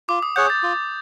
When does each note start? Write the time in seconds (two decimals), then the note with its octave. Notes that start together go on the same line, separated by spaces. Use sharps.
0.09 F4 D6
0.23 D#6
0.36 G#4 C#5 F#5 G6
0.50 A6
0.63 F4